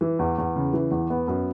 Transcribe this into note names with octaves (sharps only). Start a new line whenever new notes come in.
E3
E2
E2
C#3
E3
E2
B3
F#2